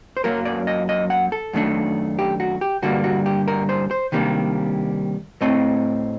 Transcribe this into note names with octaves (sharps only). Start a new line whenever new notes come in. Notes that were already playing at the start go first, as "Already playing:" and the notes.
C5
F#2 F#3 A#3 A#4
D5
D#5
D#5
F#5
A4
F#2 D#3 A3 D4
G4
F#4
G4
G2 D3 G3 A#3 F#4
F#4
G4
A#4
C5
C5
C3 D#3 G3 A#3 D4
A2 A3 C4 D#5